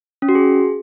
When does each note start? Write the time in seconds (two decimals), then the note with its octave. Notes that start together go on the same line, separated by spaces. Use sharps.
0.22 C#4
0.29 F#4
0.35 G#4